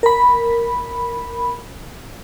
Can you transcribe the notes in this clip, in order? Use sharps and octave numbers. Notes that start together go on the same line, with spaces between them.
A#4 B5